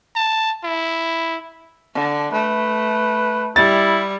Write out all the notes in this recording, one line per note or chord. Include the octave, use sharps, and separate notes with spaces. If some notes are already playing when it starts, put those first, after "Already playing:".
A5
E4
D3
A3 B4
G3 E4 A6